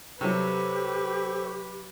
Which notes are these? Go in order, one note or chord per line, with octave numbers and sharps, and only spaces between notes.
C3 F#3 G4 A4 B4 C5 C#6